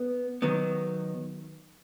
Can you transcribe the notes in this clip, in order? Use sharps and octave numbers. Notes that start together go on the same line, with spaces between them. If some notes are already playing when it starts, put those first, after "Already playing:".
Already playing: B3
D#3 F#3 B3